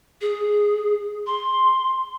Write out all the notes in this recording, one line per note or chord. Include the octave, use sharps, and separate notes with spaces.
G#4
C6